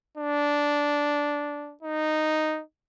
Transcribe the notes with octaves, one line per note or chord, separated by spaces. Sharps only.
D4
D#4